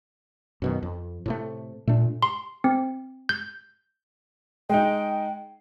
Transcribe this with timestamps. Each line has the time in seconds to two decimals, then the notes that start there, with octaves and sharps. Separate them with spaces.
0.62 F#2 B2 D#3
0.83 F2
1.26 A2 C3 A3
1.88 A#2 A3 D4
2.23 C6
2.64 C4
3.29 G6
4.70 G#3 D#4 G5